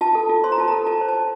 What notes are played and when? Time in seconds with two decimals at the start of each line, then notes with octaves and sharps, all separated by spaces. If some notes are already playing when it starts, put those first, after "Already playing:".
0.01 F4 A5
0.15 A4
0.29 F4
0.44 C5 C6
0.52 A#5
0.58 F4 A5
0.68 A4 A#5
0.86 F4 A5
1.01 C5
1.09 A5
1.15 F4